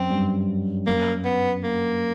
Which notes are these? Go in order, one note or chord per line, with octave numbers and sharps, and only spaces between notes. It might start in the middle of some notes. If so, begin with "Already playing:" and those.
Already playing: F#2 C4
G2
F#2 A#3
B3
A#3